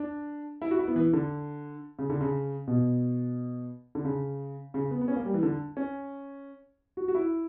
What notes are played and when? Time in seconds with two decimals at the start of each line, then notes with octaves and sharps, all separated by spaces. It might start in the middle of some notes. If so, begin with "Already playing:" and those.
Already playing: D4
0.62 E4
0.71 F#4
0.79 E4
0.88 B3
0.96 E3
1.13 D3
1.99 C#3
2.10 D3
2.21 C#3
2.68 B2
3.95 D3
4.05 C#3
4.74 C#3
4.91 B3
5.01 B3
5.08 C#4
5.16 A#3
5.25 G3
5.34 E3
5.43 D3
5.77 C#4
6.97 F#4
7.08 F#4
7.15 E4